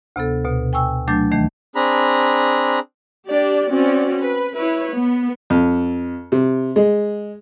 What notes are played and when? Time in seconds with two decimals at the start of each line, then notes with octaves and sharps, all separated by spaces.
0.16 D2 C3 B3 A4
0.45 D2 B2
0.73 G5 G#5 C#6 E6
1.08 F#3 A3 D4 D6 G6 A6
1.31 D#2 D#3 E3 A3
1.75 C4 D4 G#4 A#5 B5
3.29 D4 G4 D5
3.71 C4 C#4 F#4 D5
4.22 B4
4.56 E4 B4 C#5
4.96 B3
5.50 F2
6.32 C3
6.76 G#3